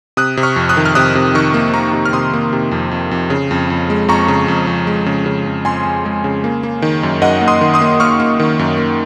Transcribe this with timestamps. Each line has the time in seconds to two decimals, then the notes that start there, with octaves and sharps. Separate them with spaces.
0.17 C3 D#6 F#6
0.37 C3
0.43 C#6 F6
0.56 F2
0.69 D#6 F#6
0.77 D#3
0.86 F6
0.95 C3 D#6 F#6
1.15 C3
1.35 D#3 C#6 F6
1.54 A#3
1.74 A#3 A#5 C#6
1.93 C3
2.05 F6
2.13 C3 C6 D#6
2.33 A#3
2.53 C3
2.71 F2
2.91 F2
3.11 F2
3.30 C#3
3.51 F2
3.70 F2
3.90 G#3
4.08 F2 A#5 C#6
4.28 C#3
4.48 F2
4.67 F2
4.87 G#3
5.06 C#3
5.26 C#3
5.46 F2
5.65 F2 G#5 C6
5.85 F2
6.05 G#3
6.24 C#3
6.44 A#3
6.63 A#3
6.82 D#3
7.03 F#2
7.22 F#2 D#5 F#5
7.41 A#3
7.48 C6 D#6
7.61 D#3
7.74 C6 D#6
7.81 A#3
8.00 A#3 C#6 F6
8.20 A#3
8.40 D#3
8.59 F#2
8.78 A#3